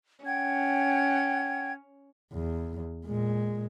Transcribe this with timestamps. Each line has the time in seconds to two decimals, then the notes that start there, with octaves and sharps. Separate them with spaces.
0.25 C#4 F#5 G5 G#6
2.33 E2
3.06 A#2 G#3